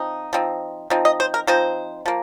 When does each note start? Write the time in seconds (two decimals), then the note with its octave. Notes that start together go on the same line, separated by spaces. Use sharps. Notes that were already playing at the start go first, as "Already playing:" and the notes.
Already playing: F3 C4 D#4
0.33 F3 C4 D#4
0.90 F3 C4 D#4
1.05 D#5
1.20 C5
1.34 A#4
1.47 F3 C4 D#4 C5
2.06 F3 A#3